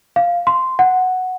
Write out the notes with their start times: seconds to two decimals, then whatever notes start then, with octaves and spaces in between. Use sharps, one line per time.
0.16 F5
0.47 C6
0.79 F#5